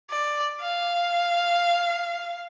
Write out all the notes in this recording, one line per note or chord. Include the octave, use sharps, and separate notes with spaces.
D5
F5